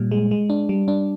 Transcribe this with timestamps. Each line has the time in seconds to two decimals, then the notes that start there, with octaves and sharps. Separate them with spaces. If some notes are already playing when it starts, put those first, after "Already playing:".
Already playing: A#2 G3
0.11 G#3
0.31 G#3
0.50 D4
0.69 G3
0.88 D4